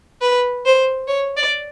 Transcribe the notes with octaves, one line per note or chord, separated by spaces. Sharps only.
B4
C5
C#5
D5